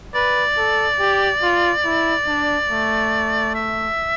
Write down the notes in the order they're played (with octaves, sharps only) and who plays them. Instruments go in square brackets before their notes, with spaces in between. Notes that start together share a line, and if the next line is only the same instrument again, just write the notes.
[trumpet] B4 [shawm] D5
[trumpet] A4
G4
F4
E4
D4
A3
[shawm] E5